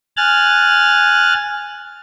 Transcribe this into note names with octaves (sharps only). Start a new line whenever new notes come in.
G#5 F6 F#6 A6